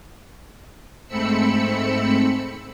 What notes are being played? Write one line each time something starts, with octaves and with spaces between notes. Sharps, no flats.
G#2 A3 C4 B5 E6 C#7